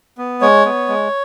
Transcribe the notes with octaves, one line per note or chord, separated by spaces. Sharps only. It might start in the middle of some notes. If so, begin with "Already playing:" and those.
B3
G#3 C#5
B3
G#3